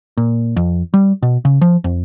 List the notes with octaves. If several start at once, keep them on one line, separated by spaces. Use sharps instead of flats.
A#2
F2
G3
B2
C#3
F3
F2